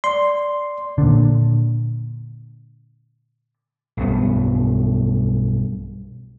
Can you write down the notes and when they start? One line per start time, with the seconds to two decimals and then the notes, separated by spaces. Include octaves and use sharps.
0.04 D5 C6
0.98 A#2 D3
3.97 B1 G2 B3